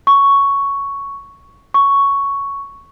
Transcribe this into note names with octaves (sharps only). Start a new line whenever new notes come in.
C#6
C#6